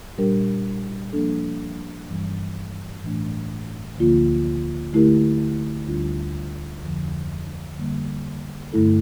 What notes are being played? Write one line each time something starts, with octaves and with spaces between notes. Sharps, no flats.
A#2 G3 D4 G4 A#4
F3 A#3 D4 A4
G2 E3 G3
A2 E3 A3 D4
D2 D3 F3 A#3 F4
D3 A3 E4 G4 A#4
D2 D3 G3 D4 F4
F2 D3 F3
D3 G3 A#3
G2 D3 A3 E4 A4